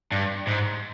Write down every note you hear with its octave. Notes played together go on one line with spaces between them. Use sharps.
G2
G#2